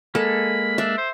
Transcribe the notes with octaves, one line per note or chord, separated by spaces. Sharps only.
G#3 A#3 A4 B5
D4 E5
C5